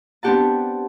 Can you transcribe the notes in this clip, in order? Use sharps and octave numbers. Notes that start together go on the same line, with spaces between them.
B3 C4 D4 G4 F#5 A5